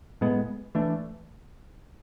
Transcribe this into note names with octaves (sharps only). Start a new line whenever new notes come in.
A2 G#3 B3
E3 A3 D4